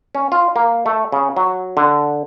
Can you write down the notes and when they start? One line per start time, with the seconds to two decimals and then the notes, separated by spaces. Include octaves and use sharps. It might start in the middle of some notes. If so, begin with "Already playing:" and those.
0.15 C#4
0.32 F4
0.56 A#3
0.86 A3
1.12 C#3
1.36 F#3
1.77 D3